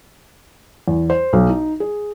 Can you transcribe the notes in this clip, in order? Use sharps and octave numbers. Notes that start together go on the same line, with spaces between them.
E2
C5
B1
D#4
G#4